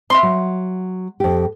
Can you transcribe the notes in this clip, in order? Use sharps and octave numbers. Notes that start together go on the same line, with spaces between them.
C4 E5 C6
F#3
F2 G4